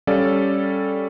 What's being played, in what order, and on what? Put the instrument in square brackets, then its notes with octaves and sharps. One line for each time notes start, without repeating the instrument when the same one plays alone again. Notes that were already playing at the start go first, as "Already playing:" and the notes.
[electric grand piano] G3 C#4 A4 D5 F5